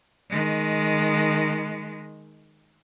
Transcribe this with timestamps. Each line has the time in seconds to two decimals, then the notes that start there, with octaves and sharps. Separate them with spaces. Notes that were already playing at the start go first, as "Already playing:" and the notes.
0.29 D#3 G#3